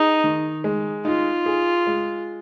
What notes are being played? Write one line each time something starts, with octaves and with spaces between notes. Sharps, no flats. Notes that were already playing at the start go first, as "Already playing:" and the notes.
Already playing: D#4 G#4
D#3
G#3
D#4 F4
G#4
G#3